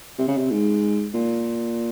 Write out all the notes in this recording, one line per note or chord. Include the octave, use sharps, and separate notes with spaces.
C3
C#3
C3
G#2
A#2